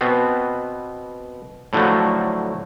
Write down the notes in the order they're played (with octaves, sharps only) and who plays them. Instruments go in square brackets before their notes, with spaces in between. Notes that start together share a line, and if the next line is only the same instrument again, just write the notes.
[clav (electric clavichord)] B2 B3 C4
A2 D3 F3 F#3 A3